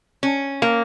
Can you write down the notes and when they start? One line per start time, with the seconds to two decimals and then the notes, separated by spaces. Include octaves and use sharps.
0.23 C#4
0.62 A#3